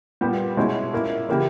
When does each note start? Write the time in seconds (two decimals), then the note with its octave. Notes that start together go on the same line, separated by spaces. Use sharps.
0.21 A#2 G3 B3 G4
0.57 B2 G#3 C#4 E4
0.93 A#2 A#3 E4
1.29 C#3 E3 A#3 E4 G4